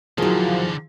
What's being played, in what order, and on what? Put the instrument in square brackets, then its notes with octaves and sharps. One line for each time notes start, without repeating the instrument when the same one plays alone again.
[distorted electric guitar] D3 D#3 [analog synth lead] F3 [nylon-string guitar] F#3 A#3 [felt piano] E4 G#4